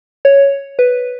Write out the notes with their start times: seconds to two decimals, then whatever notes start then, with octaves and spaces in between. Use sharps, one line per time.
0.25 C#5
0.79 B4